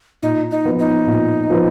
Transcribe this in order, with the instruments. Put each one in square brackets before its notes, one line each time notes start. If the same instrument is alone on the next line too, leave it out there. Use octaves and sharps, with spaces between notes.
[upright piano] A#2 [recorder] D#4
[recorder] D#4
[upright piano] F3 B3
[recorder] D#4
[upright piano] A#2
F3 B3